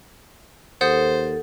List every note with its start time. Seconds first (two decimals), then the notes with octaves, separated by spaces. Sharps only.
0.81 D#2 A4 C5 F#5 D#6 G6